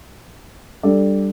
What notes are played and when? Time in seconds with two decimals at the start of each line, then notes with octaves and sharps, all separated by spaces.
0.83 G3 D4 A4 D5